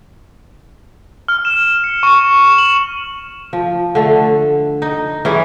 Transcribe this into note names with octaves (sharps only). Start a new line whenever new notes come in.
F6
E7
C#7
C#6
E7
F#7
F3
D3 A3
D#4
E3 C#4 G#4